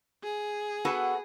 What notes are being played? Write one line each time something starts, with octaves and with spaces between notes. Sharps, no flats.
G#4
B3 F#4 A4